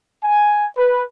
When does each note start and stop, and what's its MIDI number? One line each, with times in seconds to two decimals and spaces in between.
0.24 0.67 80
0.77 1.03 71